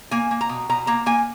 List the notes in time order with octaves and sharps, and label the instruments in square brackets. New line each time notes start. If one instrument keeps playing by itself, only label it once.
[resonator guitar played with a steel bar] A#3 G#5
A#3
A#5
B2
B2 A#5
A#3 A#5
A#3 G#5